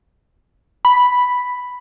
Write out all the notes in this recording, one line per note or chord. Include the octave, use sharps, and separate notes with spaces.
B5